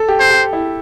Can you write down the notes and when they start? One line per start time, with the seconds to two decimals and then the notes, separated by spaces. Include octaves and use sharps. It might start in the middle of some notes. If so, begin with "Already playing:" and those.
Already playing: A4
0.08 G4
0.20 C5
0.30 G4
0.53 E4